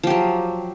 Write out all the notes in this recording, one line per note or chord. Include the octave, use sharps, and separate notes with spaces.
F3 F#3 G4